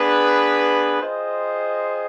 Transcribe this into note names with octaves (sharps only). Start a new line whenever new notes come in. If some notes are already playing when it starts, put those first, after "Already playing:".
Already playing: B3 D4 G#4 B4
F4 G#4 C5 D#5 G5